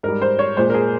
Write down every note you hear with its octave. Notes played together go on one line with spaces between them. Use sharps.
G#2 G3 A#4
C5
C#5
A#2 G#3 C5
A#4
G#4